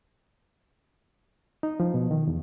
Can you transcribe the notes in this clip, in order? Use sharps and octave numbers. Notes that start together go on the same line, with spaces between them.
D#4
F3
B2
D#3
E2